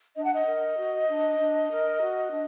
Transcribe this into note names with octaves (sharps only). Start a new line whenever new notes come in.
D4 D#5
F#5
D#5
A#4
F#4
D4
D4
A#4
F#4
D4